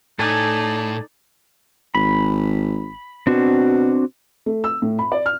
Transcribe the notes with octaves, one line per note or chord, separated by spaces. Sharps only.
A2 D#4 A4 D5 G#5
G#1 B5
B2 C4 D4 F#4
A3
E6
A2
B5
D5
F6